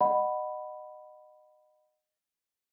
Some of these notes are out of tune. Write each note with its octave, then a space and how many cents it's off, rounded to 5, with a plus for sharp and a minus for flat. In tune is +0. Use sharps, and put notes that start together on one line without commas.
D#5 -25 F#5 +0 B5 +0